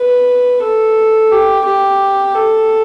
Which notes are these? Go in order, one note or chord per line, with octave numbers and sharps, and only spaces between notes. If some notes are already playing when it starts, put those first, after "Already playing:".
Already playing: B4
A4
G4
G4
A4